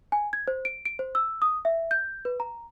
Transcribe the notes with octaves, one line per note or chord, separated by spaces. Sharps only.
G#5
G#6
C5
D7
D7
C5
E6
D#6
E5
G6
B4
A#5